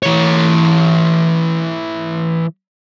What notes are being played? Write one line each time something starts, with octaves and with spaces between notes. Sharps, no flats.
E3 C#5